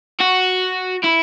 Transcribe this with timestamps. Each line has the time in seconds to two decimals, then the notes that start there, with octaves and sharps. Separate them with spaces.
0.21 F#4
1.04 E4